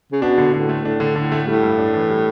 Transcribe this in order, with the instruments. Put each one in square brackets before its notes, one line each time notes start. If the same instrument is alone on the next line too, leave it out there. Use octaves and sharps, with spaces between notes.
[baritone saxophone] C#3
[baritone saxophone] B2 [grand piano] D4
[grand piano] D3
[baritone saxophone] A2 [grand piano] D3
[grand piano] A3
[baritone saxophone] A2 [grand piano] D4
[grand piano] D3
[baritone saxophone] A2 [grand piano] D3
[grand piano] A3
[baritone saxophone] A2 [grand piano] G3
[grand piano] G2
D4
E3
G3